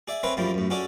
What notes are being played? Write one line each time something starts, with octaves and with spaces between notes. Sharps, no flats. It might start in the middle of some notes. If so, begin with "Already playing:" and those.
G#4 D5 E5
C4 G#4 A#4 B4 C#5 E5
F#2 F3 G3 A#3 E4
F#2 A2
C#4 F#4 G#4 A4 D5